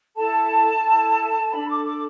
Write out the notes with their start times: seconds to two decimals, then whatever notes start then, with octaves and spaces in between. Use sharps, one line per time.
0.16 E4 A4 A5
0.83 E4 A4
1.51 D4 A4 B5
1.67 D6
1.84 D6